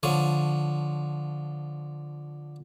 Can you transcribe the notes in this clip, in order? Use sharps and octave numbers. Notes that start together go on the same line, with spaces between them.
D3 F3 C#5